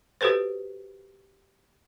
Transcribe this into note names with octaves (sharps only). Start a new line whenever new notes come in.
F#4 G4 A4 B4 C5